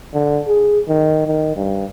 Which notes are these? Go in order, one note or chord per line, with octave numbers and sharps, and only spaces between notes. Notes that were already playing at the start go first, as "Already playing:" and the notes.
D3
G#4
D#3
D#3
G2